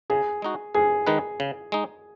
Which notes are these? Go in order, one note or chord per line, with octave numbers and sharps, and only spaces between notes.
C#3 G#4
G#3 D#4 F#4
G#2 G#4
D#3 G#3 D#4 B4
C#3
G#3 D#4